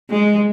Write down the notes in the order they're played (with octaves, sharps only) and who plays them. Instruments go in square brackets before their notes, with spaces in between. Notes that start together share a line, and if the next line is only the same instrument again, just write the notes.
[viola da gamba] G#3